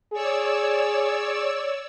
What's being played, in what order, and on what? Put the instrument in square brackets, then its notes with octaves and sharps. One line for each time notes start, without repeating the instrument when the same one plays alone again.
[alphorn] G#4 [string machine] C#5 D5 E6